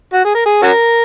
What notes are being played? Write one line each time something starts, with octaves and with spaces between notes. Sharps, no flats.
F#4
G#4
A#4
G#4
C#4 F#4 A#4